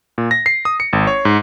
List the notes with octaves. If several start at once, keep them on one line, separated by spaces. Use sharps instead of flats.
A#2
A#6
C7
D#6
C#7
G#1
C#5
G#2